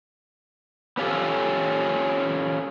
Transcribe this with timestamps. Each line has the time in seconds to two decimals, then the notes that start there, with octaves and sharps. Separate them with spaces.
0.97 B3 C#4 F4 G4 A4